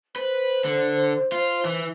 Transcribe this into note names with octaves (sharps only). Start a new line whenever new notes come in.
B4 C5
D3
F4
E3